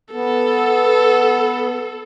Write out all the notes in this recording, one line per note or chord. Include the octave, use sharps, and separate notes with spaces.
B3 A4